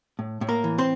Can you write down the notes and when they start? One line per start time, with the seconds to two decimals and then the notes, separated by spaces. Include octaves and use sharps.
0.19 A2
0.41 A2
0.49 A#3 A#4
0.64 E3
0.78 C4 C5